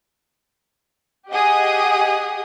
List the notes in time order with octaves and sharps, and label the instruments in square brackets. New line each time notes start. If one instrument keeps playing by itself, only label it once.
[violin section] G4 G#4 D#5 F#5 D#6